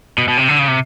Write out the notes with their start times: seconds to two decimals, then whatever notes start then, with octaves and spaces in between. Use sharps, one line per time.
0.18 B2
0.28 B2
0.38 C3
0.48 D3
0.59 C#3
0.68 C3